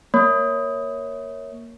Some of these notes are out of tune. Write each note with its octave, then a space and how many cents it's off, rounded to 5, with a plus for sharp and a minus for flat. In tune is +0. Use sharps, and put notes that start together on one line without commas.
A#3 +0 C#5 +0